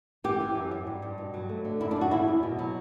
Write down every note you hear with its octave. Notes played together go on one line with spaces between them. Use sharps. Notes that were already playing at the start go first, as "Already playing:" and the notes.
E3 G4
E3
F#2
F#2
G2
G2
B2
F#3
A3
D3
F#2 E4
D4
F#2
F#4
E2 E4
E2
B2
F#3